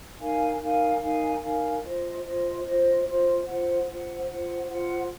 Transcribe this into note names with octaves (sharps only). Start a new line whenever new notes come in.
D#4 A#4 F5 G#5
D#4 A#4 F5 G#5
D#4 A#4 F5 G#5
D#4 A#4 F5 G#5
F4 C5 D#5
F4 C5 D#5
F4 C5 D#5
F4 C5 D#5
F4 C5 F#5
F4 C5 F#5
F4 C5 F#5
F4 C5 F#5